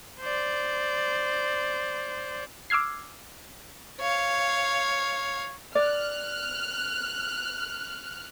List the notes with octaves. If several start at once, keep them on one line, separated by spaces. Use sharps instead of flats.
C5 D5
D6 E6 F6 G#6 C7
C#5 F5
D5 F6 F#6